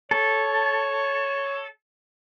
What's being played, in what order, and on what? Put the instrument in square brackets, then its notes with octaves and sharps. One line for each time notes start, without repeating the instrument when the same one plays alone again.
[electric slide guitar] A4 [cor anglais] C#5